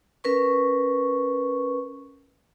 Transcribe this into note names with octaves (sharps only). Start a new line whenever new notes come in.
C#4 A#4 B4 C#6